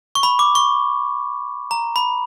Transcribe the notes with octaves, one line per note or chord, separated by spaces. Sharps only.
C#6
B5
D6
C#6
A#5
B5